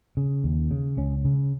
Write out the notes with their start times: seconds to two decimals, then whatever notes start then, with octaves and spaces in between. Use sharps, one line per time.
0.17 C#3
0.44 D#2
0.71 C#3
0.97 C#2 C#4
1.25 C#3